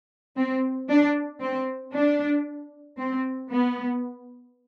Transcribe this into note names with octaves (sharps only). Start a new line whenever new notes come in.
C4
D4
C4
D4
C4
B3